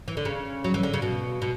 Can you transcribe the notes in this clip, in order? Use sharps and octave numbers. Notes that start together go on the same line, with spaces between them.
E3
D3
C#3
F#3
E3
D3
C#3
B2
B2